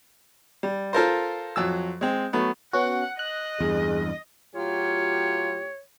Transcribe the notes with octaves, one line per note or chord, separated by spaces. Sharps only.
G3
F4 A4 A#4 C5
F2 F#3 E6
G#3 C4
F#3 A3 B3
B3 C#4 F#4 F#5
D#5 F#6
E2 G2 G#4
A2 F#3 F4 G4 C#5